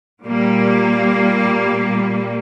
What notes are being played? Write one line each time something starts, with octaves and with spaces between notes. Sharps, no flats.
A#2 G3 A#3